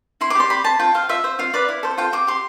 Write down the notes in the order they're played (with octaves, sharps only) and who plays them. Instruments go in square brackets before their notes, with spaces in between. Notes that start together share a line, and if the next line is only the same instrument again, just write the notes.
[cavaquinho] E4 C6
D6
G4 D5 C6
G4 B5
C5 A5
F4 G5
C5 F5
F4 E5
C5
F4 F5
B4 D5
E4
A4 C5
F4 G5
C5 D6
G4 C6